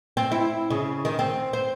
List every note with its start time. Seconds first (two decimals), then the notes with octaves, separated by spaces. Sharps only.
0.17 C4
0.32 E4
0.70 C#3
1.05 D#3
1.19 C4
1.53 C5